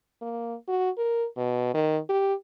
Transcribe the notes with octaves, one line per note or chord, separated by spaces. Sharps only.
A#3
F#4
A#4
B2
D#3
G4